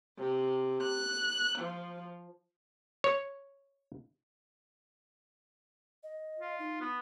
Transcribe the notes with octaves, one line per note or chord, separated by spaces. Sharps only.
C3
F#6
F3
C#5
D#5
F4
D#4
B3